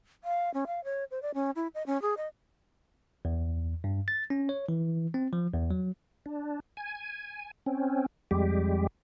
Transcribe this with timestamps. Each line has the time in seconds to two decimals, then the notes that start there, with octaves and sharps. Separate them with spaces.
0.24 F5
0.54 C#4
0.67 F5
0.84 C#5
1.11 C5
1.22 D5
1.34 C#4
1.55 E4
1.74 D#5
1.86 C#4
2.02 G#4
2.17 D#5
3.25 E2
3.84 G2
4.08 A6
4.30 C#4
4.49 C#5
4.69 E3
5.14 C4
5.33 F3
5.54 E2
5.71 F#3
6.26 D4
6.77 G#5
7.66 C4 C#4
8.31 F2 G3 G#3 G4